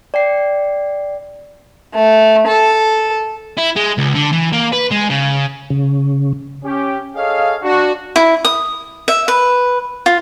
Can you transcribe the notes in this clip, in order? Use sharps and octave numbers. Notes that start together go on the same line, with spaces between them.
D5 G5 C7
A3
A4
E4
G#3
C#2
D3
E3
A#3
B4
G#3
C#3
C#3
C#4 G4
G#4 A4 C#5 D#5 F5
D4 F#4
E4
D#6
E5
B4
F4